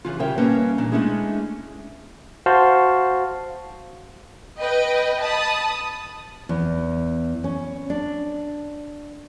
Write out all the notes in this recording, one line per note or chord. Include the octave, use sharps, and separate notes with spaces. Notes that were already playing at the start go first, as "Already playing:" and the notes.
C#3 E3 F4
C#3 G3 A#4 C#5 E5 G5
G3 A#3 C#4 B4 D#5 A5
A#2 E3 D4
G#3 A3 C#4 D4 E4 G#4
F#4 C5 F5 A5
B4 D#5 G5
A5 B5 D#6
E2
C#4
D4